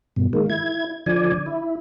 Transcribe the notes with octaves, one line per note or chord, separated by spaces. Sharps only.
G2 B2
D#3 G#3 A#3
E4 G#6
D3 F3 D5 G#5
E4